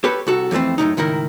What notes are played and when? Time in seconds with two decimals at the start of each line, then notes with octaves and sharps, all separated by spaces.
0.04 G4 A4 B4 C#5
0.27 C2 F#4 A4
0.51 F2 E3 G#3 A3 C4
0.78 F#2 A2 C3 D#4
0.97 C#2 A2 D#3 E4 A#4